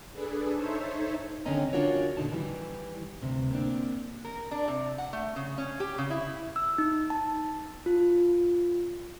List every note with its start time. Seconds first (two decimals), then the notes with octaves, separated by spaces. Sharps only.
0.12 D4 G#4 A4 B4
0.54 D#4 A4 C5 C#5 E5
1.46 D3 D#3 C4 C#4 D#5 A#5
1.73 C#4 D4 F4 F#4 A#4 C#5
2.17 A#2 D3 D#4 A5
2.32 D#3 E3 G3
3.21 D2 G2 C3
3.51 A#3 C4 D4
4.25 A#4
4.51 D4
4.68 C3
4.98 F#5
5.13 A3
5.36 C#3
5.58 C#4
5.80 G4
5.98 C#3
6.10 E4
6.56 E6
6.78 D#4
7.10 A5
7.86 F4